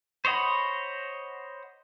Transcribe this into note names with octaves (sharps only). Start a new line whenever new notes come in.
C5 C#5 D#5 F#5 B5